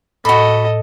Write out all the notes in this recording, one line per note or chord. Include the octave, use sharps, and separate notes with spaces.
A2 F#4 A4 D#5 B5